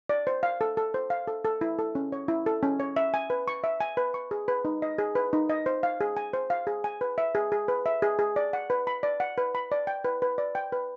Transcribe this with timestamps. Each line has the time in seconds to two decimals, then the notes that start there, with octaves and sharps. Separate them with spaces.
0.09 D5
0.27 C5
0.43 F5
0.61 A4
0.77 A4
0.94 C5
1.10 F5
1.28 A4
1.45 A4
1.61 E4
1.79 A4
1.95 C#4
2.12 C#5
2.28 E4
2.46 A4
2.63 C#4
2.80 C#5
2.96 E5
3.14 G#5
3.30 B4
3.48 C#6
3.64 E5
3.81 G#5
3.97 B4
4.14 C#6
4.31 G#4
4.48 B4
4.65 D#4
4.82 D#5
4.98 G#4
5.15 B4
5.33 D#4
5.50 D#5
5.66 C5
5.83 F5
6.01 G#4
6.17 G#5
6.33 C5
6.50 F5
6.67 G#4
6.84 G#5
7.01 B4
7.18 E5
7.35 G#4
7.52 G#4
7.68 B4
7.86 E5
8.02 G#4
8.19 G#4
8.36 D5
8.53 F#5
8.70 B4
8.87 B5
9.03 D5
9.20 F#5
9.38 B4
9.55 B5
9.72 D5
9.87 G5
10.05 B4
10.22 B4
10.38 D5
10.55 G5
10.72 B4